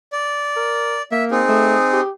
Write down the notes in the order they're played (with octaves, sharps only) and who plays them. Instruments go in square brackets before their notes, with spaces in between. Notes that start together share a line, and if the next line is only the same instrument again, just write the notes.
[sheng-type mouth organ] D5
[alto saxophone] A#4
[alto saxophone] A#3 [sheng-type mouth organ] E5
[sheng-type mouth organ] C4 D#4 G#4
[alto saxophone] A3
G4